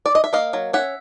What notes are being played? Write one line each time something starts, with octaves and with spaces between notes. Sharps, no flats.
D5
D#5
E5
A#3 D#5 F5
F#3
C#4 E5 F#5